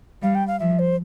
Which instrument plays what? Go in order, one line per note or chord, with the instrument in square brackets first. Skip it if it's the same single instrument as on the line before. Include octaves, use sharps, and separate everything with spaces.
[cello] G3 [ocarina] F5
[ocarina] G5
F5
[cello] F3 [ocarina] E5
[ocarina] C5